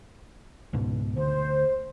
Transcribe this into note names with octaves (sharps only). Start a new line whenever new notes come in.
C#2 G#2 B2
D2 C5